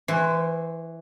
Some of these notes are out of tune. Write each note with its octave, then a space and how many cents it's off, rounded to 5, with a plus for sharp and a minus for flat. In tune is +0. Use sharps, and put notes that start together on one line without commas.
E3 +0 C5 -30 C6 +45